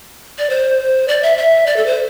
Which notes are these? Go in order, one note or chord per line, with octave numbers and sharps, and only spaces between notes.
D5
C5
D5
E5
E5
D5
A4
C5